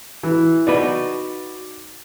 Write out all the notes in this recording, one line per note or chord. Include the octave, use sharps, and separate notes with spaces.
E3
D#4 F#4 B4 D5